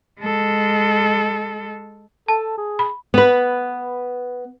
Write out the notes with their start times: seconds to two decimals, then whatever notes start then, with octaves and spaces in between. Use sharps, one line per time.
0.20 G#3 A4
2.28 A4 A5
2.58 G#4
2.79 B5
3.14 B3 B4